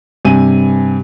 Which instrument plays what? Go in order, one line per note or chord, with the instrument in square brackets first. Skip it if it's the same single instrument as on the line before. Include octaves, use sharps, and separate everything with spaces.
[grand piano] G2 C3 G#5 D#7